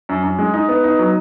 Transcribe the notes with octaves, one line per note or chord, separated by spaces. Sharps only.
F#2
F#2
G#3
D#4
B3
D#4
F#3